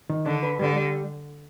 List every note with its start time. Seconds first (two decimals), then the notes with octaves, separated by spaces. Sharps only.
0.10 D#3
0.26 D3 D4
0.43 B4
0.59 D3 G3
0.76 G3